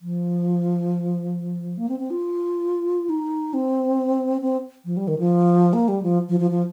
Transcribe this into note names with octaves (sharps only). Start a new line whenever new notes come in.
F3
A#3
C4
C4
F4
D#4
C4
C4
F3
G3
D#3
F3
A#3
G3
F3
F3
F3
F3